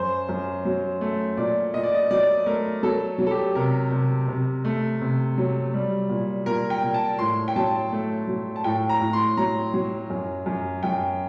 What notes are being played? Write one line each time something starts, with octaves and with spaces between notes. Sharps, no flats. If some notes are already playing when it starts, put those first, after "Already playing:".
Already playing: F#2 C5
F#2
F#3
A3
A#2 D5
A#2 D#5
D5
D#5
F#3 D5
A3 A#4
F#3 A4
F#3
A4
G4
C3 A#4
C3
C3
A3
C3
F#3
G3
A#2
A#2 A#4
G5
A#2
A5
A2 C6
G5
F#3 A5
A3
F#3
A5
A2 G5
A#5
A2
C6
F#3 A#5
F#3
F#2
F#2
F#2 G5